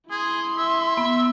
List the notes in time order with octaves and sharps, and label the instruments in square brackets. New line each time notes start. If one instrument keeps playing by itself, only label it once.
[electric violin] E4 C6 [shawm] G#4
[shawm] E5
[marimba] B3